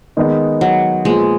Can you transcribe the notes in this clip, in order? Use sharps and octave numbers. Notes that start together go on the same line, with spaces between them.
D#3 G#3 B3 D#4
F#3
A#2 F3 G#3 B3